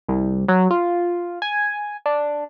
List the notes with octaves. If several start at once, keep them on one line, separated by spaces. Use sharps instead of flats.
C2
F#3
F4
G#5
D4